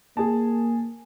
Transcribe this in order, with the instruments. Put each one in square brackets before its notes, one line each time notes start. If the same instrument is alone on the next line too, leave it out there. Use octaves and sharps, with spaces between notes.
[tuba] A#3 [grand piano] G#4 A5